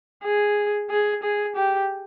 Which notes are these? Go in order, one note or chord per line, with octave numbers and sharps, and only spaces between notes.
G#4
G#4
G#4
G4